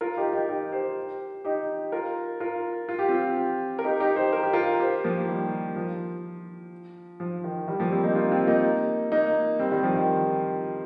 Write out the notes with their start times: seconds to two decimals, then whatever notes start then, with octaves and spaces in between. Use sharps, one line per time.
0.01 F4 A#4
0.17 D#4 G4
0.33 D#4 G4
0.49 D#4 G4
0.72 G4 C5
1.45 D#4 G4
1.92 F4 A#4
2.40 F4 A#4
2.89 F4
2.99 G4
3.09 C4 F4
3.79 A#4
3.84 D#4 G4
4.00 D#4 G4
4.16 G4 C5
4.33 A#4
4.43 G4
4.53 F4 A#4
4.80 G4 C5
5.04 F3 A#3
5.28 D#3 G3
5.76 F3
7.20 F3
7.44 D#3
7.68 D#3 G3
7.80 F3 A#3
7.92 G3 C4
8.04 A#3 D#4
8.15 C4 F4
8.32 C4 F4
8.48 A#3 D#4
9.12 A#3 D#4
9.59 G3 C4
9.72 D#3 G3
9.83 F3
9.95 D#3